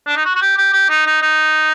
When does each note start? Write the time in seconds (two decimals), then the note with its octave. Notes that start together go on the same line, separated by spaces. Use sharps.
0.07 D4
0.16 D#4
0.25 F#4
0.35 F#4
0.41 G4
0.57 G4
0.73 G4
0.90 D#4
1.06 D#4
1.22 D#4